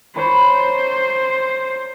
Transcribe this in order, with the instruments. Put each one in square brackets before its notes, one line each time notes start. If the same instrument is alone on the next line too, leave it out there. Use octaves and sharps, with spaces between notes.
[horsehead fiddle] C5 [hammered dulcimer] C#5 A#5 B5